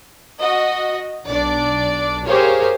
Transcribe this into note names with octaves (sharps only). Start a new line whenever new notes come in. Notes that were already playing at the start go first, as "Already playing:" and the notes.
F#4 D#5
B1 D4 D5
G4 G#4 A#4 C5 C#5 F5